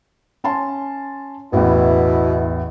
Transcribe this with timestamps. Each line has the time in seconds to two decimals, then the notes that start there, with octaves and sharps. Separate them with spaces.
0.44 C#4 A5 C6
1.53 A1 E2 B2 E4